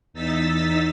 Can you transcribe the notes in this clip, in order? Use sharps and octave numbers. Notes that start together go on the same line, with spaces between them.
E2 D#4 E6 A6 B6